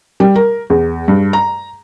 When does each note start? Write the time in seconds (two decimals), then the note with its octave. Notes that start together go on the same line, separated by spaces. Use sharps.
0.20 G3
0.35 A#4
0.70 E2
1.08 G2
1.33 A#5